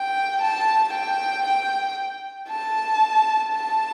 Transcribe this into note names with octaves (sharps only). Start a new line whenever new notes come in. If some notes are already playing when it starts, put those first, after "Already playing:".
Already playing: G5
A5
G5
G5
A5
A5